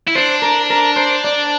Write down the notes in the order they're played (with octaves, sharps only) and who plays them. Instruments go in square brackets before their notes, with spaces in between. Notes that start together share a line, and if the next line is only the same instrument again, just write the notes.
[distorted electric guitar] E4
[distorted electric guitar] D4 [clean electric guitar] C5
[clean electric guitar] A#4
A#4
C5
D5